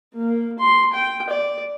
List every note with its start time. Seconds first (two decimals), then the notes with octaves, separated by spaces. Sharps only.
0.14 A#3
0.59 C6
0.93 G5
1.29 D5